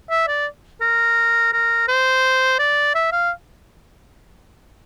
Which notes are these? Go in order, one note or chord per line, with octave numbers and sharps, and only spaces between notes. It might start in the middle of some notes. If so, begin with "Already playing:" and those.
E5
D5
A#4
A#4
C5
D5
E5
F5